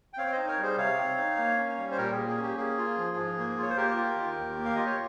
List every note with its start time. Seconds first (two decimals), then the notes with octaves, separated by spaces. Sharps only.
0.13 G5
0.17 C4 C#5 F5
0.28 C#5
0.32 D#4 C5 D#5
0.47 A#4 C#5
0.58 G3 G#4 C5
0.77 C3 C#5 F5
0.98 C4
1.18 D#4
1.37 A#3
1.58 C#4
1.77 G3
1.91 C5
1.97 A#2 G4 A#4
2.12 A#3 G#4
2.27 G#4
2.37 C#4
2.43 G4
2.57 A#3 G#4
2.78 F4
2.98 F3
3.17 G#2
3.38 A#3
3.58 F4 C#5
3.70 C5
3.77 A#3 G4 A#4
3.97 F4
4.16 D#3
4.36 D#2
4.57 A#3
4.65 F5
4.76 F4 D#5
4.86 C#5